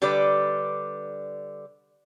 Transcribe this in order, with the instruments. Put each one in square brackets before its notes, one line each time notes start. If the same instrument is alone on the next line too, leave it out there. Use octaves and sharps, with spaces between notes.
[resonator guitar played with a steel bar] D3 G3 B4 D5